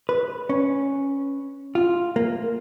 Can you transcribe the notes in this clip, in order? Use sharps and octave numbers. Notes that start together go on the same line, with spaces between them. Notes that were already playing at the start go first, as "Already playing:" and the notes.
B4
C#4
F4
A#3